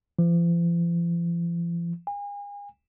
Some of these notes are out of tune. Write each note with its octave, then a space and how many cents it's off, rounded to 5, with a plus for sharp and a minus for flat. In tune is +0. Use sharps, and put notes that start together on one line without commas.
F3 -45
G#5 -40